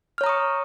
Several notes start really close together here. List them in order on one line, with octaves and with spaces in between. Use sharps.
F6 C#5 A#5 D#6 C#6